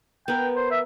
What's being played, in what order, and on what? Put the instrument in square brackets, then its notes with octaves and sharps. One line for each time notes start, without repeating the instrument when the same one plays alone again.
[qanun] B3 A#4 [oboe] G5
[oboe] C5
E5